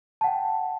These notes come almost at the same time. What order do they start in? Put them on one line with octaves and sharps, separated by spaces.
A5 F#5 G5